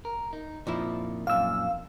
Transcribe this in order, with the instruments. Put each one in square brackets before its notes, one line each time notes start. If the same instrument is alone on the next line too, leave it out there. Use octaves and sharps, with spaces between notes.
[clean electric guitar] A#4
D#4
[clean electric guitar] F2 D#4 [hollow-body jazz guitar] A#2 F3 E4
[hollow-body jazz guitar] F#2 A#2 [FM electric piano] F5 E6